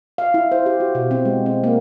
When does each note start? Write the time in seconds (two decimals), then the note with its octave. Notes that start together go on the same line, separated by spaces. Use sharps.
0.18 F5
0.34 E4
0.52 C5
0.66 G4
0.80 F#4
0.95 B2
1.11 C4
1.25 G#3
1.46 C4
1.64 A#3